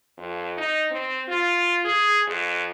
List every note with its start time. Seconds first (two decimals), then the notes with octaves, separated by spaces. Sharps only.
0.17 F2
0.57 D#4
0.91 C4
1.28 F4
1.85 G#4
2.27 F2